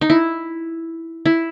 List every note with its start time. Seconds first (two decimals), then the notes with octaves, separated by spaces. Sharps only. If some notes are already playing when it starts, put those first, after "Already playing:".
0.01 D#4
0.10 E4
1.26 E4